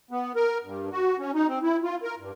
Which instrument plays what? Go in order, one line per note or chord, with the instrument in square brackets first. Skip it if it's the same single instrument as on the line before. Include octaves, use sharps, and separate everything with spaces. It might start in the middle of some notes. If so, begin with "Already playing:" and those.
[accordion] B3
A#4
G2
F#4
C#4
D#4
C4
E4
F4
A#4
G2